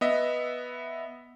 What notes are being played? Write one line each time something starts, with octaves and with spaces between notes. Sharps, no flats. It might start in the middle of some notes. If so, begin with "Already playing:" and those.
B3 D#5 E5